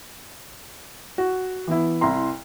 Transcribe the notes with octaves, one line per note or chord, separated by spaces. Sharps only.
F#4
E3 B3 E4
C2 E4 A#5 C6